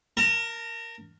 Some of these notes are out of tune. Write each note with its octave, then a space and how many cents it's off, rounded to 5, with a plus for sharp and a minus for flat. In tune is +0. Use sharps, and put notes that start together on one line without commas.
A#4 +0 A5 +40